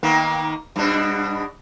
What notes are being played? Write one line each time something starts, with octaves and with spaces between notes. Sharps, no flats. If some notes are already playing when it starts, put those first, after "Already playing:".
D#3 A#3 B3
G2 B2 D4